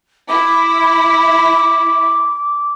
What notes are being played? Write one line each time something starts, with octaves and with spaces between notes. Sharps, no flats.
E4 D6